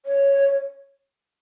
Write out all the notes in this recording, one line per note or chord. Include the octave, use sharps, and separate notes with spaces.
C#5